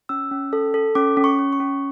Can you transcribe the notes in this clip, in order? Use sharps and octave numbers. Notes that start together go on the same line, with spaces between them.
C#4 E6
C#4
A4
A4
C#4 D6
C#4
C#6
C#4
C#6
C#4